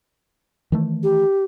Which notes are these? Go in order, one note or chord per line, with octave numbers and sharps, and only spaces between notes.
D#3 E3 A3
G4